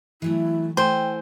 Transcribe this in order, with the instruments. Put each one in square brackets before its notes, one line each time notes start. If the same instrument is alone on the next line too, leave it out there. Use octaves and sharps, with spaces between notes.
[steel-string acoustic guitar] E3 F#3 A3 [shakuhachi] E4
[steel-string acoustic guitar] A3 E4 G#5 [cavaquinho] C5 [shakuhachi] G5